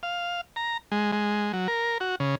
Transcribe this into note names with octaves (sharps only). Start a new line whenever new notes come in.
F5
A#5
G#3
G#3
F#3
A#4
F#4
C#3